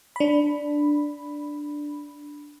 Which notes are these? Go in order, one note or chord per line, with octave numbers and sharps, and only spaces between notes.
D4 B5